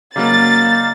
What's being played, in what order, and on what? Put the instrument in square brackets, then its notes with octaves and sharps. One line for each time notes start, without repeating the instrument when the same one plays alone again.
[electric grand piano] C#3 F#3 A#3 [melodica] D#4 D5 F5 [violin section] A6